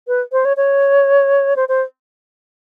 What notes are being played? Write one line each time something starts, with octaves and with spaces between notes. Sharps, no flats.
B4
C5
C#5
C#5
C5
C5